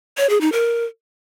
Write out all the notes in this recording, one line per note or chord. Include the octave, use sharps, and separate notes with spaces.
C#5
G#4
D#4
A#4